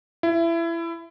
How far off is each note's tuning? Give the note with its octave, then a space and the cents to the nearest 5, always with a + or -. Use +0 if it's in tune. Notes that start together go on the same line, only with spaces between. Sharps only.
E4 +25